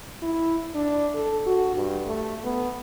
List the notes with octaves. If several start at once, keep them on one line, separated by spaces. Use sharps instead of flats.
E4
D4
A4
F#4
G2
A3
B3